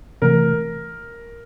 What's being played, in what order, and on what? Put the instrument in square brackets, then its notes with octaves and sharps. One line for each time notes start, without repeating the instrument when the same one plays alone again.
[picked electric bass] C3 E3 A3 [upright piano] A#4